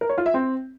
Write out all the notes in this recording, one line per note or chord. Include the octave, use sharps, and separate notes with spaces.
A#4
C#5
F4
E5
C4